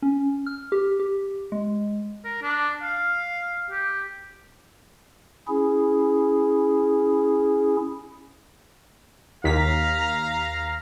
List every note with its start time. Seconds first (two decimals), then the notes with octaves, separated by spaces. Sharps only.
0.02 C#4
0.46 F6
0.72 G4
1.00 G4
1.52 G#3
2.25 A#4
2.42 D4
2.83 F5
3.70 G4
5.48 C#4 E4 G#4
9.44 D#2 F5 A#5 B6